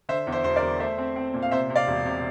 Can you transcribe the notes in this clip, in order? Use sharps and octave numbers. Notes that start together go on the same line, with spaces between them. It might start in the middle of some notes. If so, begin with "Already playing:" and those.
D3 C5 E5
E2
C5 E5
E1 C5
A#4 D5
E1
A3 C5 E5
C4
C4
A#2
F5
C3 C5 E5
C3
D5 F5
E1
C3